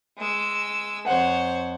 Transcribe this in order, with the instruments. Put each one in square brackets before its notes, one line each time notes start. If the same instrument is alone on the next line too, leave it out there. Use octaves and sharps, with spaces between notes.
[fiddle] G#3 E6
[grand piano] F2 F#5 [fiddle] C5 C#5